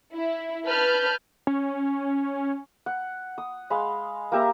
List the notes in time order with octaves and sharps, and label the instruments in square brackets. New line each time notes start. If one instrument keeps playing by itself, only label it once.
[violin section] E4
B4 A5 F6 G6
[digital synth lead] C#4
[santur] F#5
D#6
G#3 F5 B5 C6
A#3 G4 E5 A#5